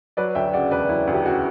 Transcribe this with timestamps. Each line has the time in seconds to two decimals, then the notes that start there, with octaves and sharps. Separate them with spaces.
0.17 F#3 B4 D5
0.35 D2 E5 G5
0.53 C#3 D5 F#5
0.71 E1 B4 D5
0.89 F#3 E4
1.07 D2
1.14 G4
1.25 C#3 F#4